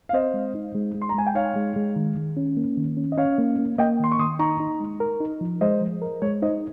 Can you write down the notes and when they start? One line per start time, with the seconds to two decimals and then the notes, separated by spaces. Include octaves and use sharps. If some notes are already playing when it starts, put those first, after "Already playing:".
0.09 F5
0.13 C4 C5 D#5
0.34 G#3
0.55 D#4
0.75 G#3
0.95 G#3
1.02 C6
1.09 A#5
1.14 G#3 G#5
1.26 G5
1.35 D#4 C#5 F5
1.56 G#3
1.76 G#3
1.96 D#3
2.16 D#3
2.37 C#4
2.57 A#3
2.77 D#3
2.97 C#4
3.12 D#5
3.18 C#4 C#5 F5
3.38 A#3
3.58 A#3
3.78 A#3 D#5 G5
4.00 D#3 C6
4.12 C#6
4.19 D#3 C6 D#6
4.39 D#4 A#5 C#6
4.60 D#4
4.80 G#3
5.00 A#4
5.20 D#4
5.41 F3
5.61 G#3 C5 D#5
5.81 F3
6.02 A#4
6.22 G#3 C#5
6.42 D#4 C5 D#5